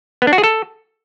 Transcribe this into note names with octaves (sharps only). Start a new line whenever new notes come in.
B3
D4
F#4
G#4
A4